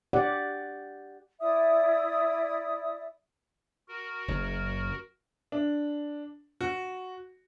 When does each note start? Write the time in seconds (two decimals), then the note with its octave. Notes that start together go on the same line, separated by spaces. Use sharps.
0.13 G4 D5 F#5
1.41 E4 D5 E5 D#6
3.88 F#4 A#4
4.28 F#1 F#2
5.52 D4
6.61 F#4